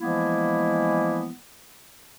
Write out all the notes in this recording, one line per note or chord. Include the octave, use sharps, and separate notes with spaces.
E3 F3 G#3 A#3 B3 E4